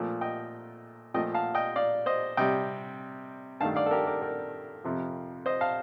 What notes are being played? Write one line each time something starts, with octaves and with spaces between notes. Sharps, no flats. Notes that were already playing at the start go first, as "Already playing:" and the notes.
Already playing: A#2 F3 A3
D#5 G5
A#2 F3 A3 D#5 G5
F5 A5
D#5 G5
D5 F5
C5 D#5
C3 G3 D#5 G5
G2 D#3 A3 F5 A5
D5 F5
A4
G4 A#4
A#4 D5
A#4 D5
F2 C3 F3
C5 D#5
F5 A5